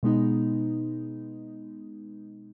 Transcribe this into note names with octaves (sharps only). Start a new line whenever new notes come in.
B2 G#3 B3 D#4